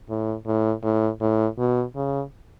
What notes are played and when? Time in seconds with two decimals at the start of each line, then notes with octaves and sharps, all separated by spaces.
0.10 A2
0.47 A2
0.83 A2
1.21 A2
1.58 B2
1.96 C#3